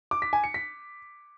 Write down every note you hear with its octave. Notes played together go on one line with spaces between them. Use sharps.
D6
B6
G#5
C#7
B6